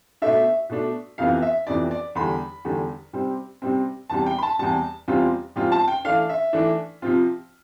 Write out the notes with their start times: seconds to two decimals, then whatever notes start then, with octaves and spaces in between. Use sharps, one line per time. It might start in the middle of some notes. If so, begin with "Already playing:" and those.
0.22 B2 A3 D4 E5
0.69 B2 A3 D4
1.18 F2 C3 E3 B3 F5
1.42 E5
1.67 F2 C3 E3 B3 D5
1.91 D5
2.15 E2 D3 G3 B5
2.65 E2 D3 G3
3.13 C3 G3 C4
3.62 C3 G3 C4
4.10 E2 C3 G3 A5
4.26 G5
4.38 B5
4.43 A5
4.59 E2 C3 G3 A5
5.08 E2 C3 G3 C4 F4
5.56 E2 C3 G3 C4 F4
5.72 A5
5.88 G5
6.05 E3 A3 D4 F5
6.29 E5
6.53 E3 A3 D4
7.02 C3 F3 C4 F4